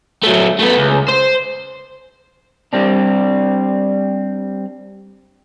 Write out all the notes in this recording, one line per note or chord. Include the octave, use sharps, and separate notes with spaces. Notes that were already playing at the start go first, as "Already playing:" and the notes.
F#3 A3
A3 B3
C#2
C5
G3 C4 D4